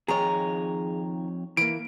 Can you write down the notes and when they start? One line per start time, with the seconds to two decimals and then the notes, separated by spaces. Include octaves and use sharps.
0.08 F2 D#3 G#4 C#5 A#5
1.57 E3 A#3 D7